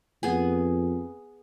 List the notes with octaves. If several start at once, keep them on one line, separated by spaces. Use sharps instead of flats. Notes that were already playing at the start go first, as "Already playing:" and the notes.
F2 B3 G#4 G#5